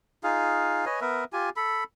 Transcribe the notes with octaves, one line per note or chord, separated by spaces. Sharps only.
D#4 F4 G#4 F5
B4 C#5 D#5 G#5
B3 A#4 B4 E5
F4 G4 G#5
A4 B5